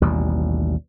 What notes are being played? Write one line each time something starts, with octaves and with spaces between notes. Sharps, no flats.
A1 D#2 B2 G3